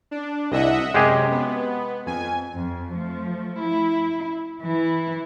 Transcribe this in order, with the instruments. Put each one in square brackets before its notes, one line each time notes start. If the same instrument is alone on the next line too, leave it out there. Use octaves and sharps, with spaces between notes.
[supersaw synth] D4
[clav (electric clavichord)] C2 [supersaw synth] D#5 E5 F#5
[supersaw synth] F#2 C3 [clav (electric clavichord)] G#3 G4 G#4
[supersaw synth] B3
F2 G#5
[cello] F2
F3 A3
E4
E3 E4